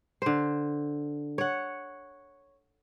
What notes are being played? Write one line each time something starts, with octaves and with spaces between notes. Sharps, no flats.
D3 C5
C#5 F#5